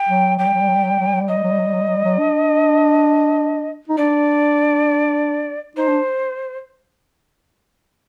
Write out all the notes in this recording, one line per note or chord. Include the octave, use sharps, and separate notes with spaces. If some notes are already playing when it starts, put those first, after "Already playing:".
Already playing: G5
F#3
F#3 G5
G3
F#3
G3
F#3
G3
F#3
G3
F#3
G3
F#3
G3
F#3 D#5
G3
F#3
G3
F#3
G3
F#3
G3
F#3
G3
F#3
D4
D#4
D4 D5
D#4 C5
D4